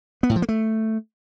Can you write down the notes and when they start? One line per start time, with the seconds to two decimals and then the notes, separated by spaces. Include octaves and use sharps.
0.23 B3
0.30 A2
0.36 F3
0.42 A#3
0.49 A3